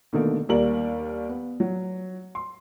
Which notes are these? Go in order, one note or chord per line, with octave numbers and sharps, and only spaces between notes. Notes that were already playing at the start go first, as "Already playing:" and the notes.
B2 D3 D#3 A3 A#3
D#2 G3 A#3 A#4 F#7
B3
F#3
C6